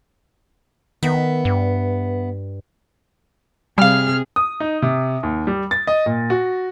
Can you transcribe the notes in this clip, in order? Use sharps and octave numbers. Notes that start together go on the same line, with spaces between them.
D#3 B3 E5
G2
C3 G3 G#4 F5 F6
D#6
D#4
C3
D#2
G3
A6
D#5
A#2
F#4